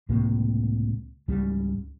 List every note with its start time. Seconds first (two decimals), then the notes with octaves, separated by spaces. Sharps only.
0.09 C#2 A2 C3 A#3
1.28 C#2 G#2 C#3 G3